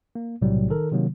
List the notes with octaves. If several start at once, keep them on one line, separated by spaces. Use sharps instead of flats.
A#3
B1 A2 C3 F#3 G3
D#3 A4 A#4
C3 D#3 F#3 A#3